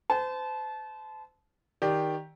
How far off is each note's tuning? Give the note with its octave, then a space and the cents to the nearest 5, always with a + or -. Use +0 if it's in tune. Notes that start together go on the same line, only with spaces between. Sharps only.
C5 -35 A5 -25
D#3 +10 G4 +0 D5 +0